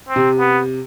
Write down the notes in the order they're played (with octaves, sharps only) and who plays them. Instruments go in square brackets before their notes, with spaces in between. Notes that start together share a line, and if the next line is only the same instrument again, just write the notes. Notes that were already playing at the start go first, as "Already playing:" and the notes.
[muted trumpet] C4
[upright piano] C3
[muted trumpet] B3